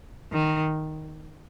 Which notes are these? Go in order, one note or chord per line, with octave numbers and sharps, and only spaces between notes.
D#3